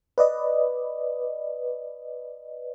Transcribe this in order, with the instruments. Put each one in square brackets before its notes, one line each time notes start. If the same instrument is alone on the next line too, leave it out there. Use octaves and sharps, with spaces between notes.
[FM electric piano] B4 D5 D#5